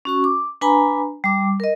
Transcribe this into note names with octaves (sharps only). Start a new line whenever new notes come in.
C#4 F#4 C#6
D6
D4 B4 G#5 A#5 B5
G3 D6
A#4 D#5